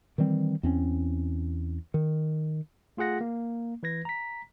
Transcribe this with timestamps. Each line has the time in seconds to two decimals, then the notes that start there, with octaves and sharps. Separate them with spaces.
0.18 D#3 E3 G3 C4
0.63 E2 C4 C#4
1.94 D#3
2.97 A3 F4 G#4 F#5 A#6
3.21 A#3
3.83 E3 B4 G#6 A#6
4.05 A#5 B6